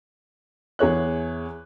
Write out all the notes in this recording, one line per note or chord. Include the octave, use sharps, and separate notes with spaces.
E2 G#4 C#5 F#6